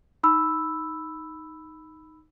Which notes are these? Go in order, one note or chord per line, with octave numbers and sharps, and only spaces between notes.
D#4 B5 E6